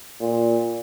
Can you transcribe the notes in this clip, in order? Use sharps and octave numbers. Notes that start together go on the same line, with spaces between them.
A#2